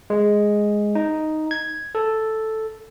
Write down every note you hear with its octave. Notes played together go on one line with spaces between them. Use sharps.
G#3
D#4
G#6
A4